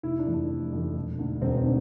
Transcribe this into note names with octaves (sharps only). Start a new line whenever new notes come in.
F1 E4
D4
F2 E3 A3
D4
F1
F2 E3 A3
E1
D2 D3
E1 C4
C4
D3